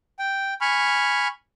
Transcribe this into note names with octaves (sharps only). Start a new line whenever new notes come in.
G5
G#5 B5 C#6 F6